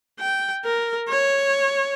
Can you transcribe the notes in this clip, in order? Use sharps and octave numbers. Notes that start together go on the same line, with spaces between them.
G5
A#4
C#5